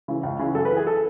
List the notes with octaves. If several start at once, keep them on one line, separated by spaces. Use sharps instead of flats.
C#3 E3
C#2
C#3 E3
F#2 A4
B4
E3
G#4
A4